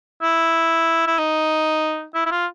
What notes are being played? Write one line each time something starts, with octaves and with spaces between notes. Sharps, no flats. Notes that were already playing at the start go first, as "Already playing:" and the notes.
E4
E4
D#4
E4
E4
F4